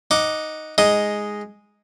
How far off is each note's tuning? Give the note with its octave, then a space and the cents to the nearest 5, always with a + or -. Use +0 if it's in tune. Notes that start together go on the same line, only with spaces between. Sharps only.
D#4 +0 F#5 -5 D6 +0
G#3 +0 D#4 +0 D#6 +0